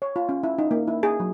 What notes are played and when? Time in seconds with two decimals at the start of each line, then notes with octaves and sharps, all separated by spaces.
0.02 C#5
0.16 F4
0.29 C#4
0.43 E4
0.59 D#4
0.71 A#3
0.87 E4
1.03 G#4
1.20 F#3